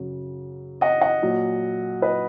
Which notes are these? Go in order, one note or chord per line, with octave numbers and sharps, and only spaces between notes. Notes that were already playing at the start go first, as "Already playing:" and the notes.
Already playing: F#2 C#3 F#3
D#5 F#5
D#5 F#5
A#2 F#3
B4 D#5